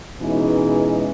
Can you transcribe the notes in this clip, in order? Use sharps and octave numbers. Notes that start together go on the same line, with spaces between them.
B2 E3 G#3 C#4 D#4